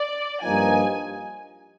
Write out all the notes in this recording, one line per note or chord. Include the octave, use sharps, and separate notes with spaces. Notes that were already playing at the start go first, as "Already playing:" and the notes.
Already playing: D5
G2 F3 A#3 D#4 G#5